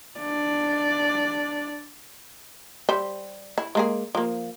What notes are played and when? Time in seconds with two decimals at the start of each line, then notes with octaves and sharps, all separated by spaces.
0.18 D4 D5
2.89 G3 C5 E5
3.58 E4
3.75 G#3 A#3 G#4
4.15 F3 A#3